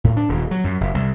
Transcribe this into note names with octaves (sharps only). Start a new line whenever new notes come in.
A2
D4
D#1
F#3
F#2
F#1
C2